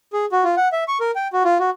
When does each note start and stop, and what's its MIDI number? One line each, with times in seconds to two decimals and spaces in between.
0.13 0.25 68
0.32 0.44 66
0.44 0.55 65
0.57 0.68 78
0.72 0.84 76
0.88 0.98 85
1.00 1.11 70
1.16 1.28 79
1.33 1.43 66
1.45 1.58 65
1.60 1.70 66